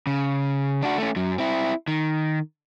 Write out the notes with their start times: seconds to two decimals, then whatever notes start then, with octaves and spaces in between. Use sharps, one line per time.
0.07 C#3
0.83 D4 F#4
0.98 A3 C#4
1.16 F#2 F#3
1.38 C4 E4
1.88 D#3